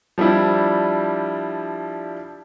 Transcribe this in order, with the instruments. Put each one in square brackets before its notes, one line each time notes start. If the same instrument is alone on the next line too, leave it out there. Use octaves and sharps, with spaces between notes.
[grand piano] F3 G3 D4 E4